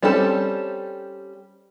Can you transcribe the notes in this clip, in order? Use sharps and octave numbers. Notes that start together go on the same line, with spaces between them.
G3 C4 C#4 G4 A4